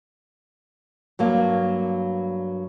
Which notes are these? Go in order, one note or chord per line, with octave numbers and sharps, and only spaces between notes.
G2 F#3 A#3